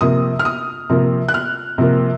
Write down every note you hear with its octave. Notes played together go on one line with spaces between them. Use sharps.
C3 F3 A#3 D#6
F6
D#6
C3 F3 A#3
F#6
F6
C3 F3 A#3